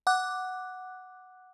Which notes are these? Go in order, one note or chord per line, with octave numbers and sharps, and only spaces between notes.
F#5 D6 F#6